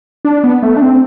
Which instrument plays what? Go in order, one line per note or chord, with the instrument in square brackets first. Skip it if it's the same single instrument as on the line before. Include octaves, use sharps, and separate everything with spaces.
[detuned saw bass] D4
B3
A3
D4
C4